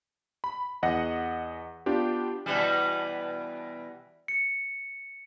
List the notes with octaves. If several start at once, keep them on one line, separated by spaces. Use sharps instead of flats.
B5
E2 D#5 F#5 A#6
B3 D4 F4 G4
B2 E3 G3
C#7